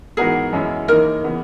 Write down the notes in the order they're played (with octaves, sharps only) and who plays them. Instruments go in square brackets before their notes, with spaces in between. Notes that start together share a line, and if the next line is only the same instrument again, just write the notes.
[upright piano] G#2 E3 B3 F#4 A#4 [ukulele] G#4
[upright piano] F#2 E3 G#3 C#4 E4
[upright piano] D#2 C#3 E3 A#3 D#4 [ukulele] A#4
[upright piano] C#3 E3 B3